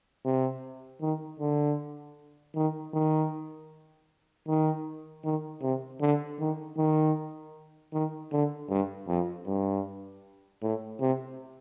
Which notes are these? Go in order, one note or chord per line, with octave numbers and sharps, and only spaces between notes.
C3
D#3
D3
D#3
D#3
D#3
D#3
C3
D3
D#3
D#3
D#3
D3
G2
F2
G2
A2
C3